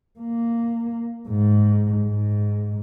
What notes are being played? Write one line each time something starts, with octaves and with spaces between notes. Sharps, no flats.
A#3
G#2
G#2